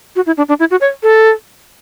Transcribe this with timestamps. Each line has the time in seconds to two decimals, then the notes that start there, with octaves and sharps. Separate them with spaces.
0.16 F#4
0.26 E4
0.37 D4
0.49 D4
0.60 E4
0.71 F#4
0.81 C#5
1.03 A4